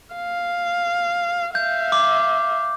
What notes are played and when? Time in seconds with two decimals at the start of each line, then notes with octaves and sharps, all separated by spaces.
0.15 F5
1.55 E5 F5 G6
1.92 D6